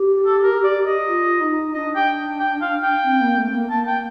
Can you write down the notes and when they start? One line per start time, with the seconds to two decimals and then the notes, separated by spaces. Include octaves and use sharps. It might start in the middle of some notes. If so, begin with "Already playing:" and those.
Already playing: G4
0.26 A4
0.43 A#4
0.64 D5
0.86 D#5
1.08 F4
1.41 D#4
1.74 D4 D#5
1.96 G5
2.39 G5
2.62 F5
2.83 G5
3.04 C4
3.21 A#3
3.37 A3
3.48 C4
3.54 A#3
3.70 A#3 A5
3.87 G5